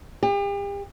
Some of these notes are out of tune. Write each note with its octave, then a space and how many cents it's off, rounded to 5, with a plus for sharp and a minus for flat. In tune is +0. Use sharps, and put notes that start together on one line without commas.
G4 +40